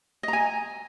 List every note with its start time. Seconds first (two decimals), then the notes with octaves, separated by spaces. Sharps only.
0.23 D#5
0.28 A#5
0.33 G#5